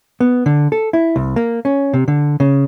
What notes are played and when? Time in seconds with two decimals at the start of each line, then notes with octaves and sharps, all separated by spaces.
0.20 B3
0.46 D3
0.72 A4
0.93 E4
1.16 C2
1.36 A#3
1.65 C#4
1.93 C3
2.08 D3
2.40 C#3